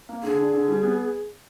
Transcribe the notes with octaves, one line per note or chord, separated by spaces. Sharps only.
A#3
D3 G#4
D4
D3
G3
B3